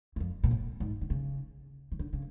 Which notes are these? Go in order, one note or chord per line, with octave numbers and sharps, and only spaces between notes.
F#2
F2
A#2
A2
G#2
D3
C#3
D#3
D3
C#3